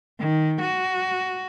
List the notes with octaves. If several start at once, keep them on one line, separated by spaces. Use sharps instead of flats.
D#3
F#4